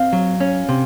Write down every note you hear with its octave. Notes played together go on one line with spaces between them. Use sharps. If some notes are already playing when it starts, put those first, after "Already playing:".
Already playing: C4 F5
F#3
C#4
C3